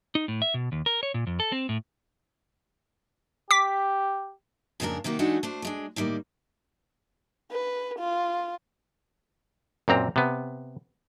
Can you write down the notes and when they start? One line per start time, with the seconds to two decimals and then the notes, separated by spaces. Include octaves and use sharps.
0.15 D#4
0.28 A2
0.42 E5
0.54 B2
0.72 D#2
0.86 A#4
1.03 C#5
1.14 A#2
1.27 F2
1.40 A4
1.52 C4
1.69 A2
3.51 G4 D6 B6
4.80 F2 G#2 C#3 A#3 D4 A#4
5.04 C3 D#3 A#3 F#4
5.19 E3 G#3 A3 D4 D#4 F#4
5.43 A3 D4 C5
5.62 D2 G#3 D4
5.96 A2 D#3 G3 A#3
7.52 B4
7.99 F4
9.88 F#2 A#2 C4 A#5
10.16 C3 B3